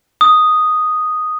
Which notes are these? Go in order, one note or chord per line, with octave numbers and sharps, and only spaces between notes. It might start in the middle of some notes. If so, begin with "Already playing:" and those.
D#6